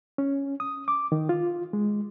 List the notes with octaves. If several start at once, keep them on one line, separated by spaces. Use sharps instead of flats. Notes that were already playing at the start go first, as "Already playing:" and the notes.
C#4
D#6
D6
D#3
F4
G#3